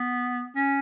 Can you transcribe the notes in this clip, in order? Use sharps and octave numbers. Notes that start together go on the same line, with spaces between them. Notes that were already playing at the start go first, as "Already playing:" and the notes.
Already playing: B3
C#4